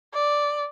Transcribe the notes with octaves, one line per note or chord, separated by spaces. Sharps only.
D5